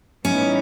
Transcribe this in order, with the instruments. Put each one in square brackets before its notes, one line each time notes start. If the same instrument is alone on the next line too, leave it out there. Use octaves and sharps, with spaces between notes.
[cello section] A2 E3 G3 B3 D#4 [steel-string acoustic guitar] C#4